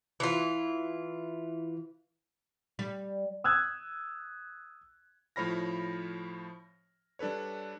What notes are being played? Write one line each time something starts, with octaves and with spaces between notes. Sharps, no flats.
E3 F4
G3
D#6 E6 F#6 G#6
A2 F3 C#5 B5 F6 A#6
G3 D4 A4 B4 C#5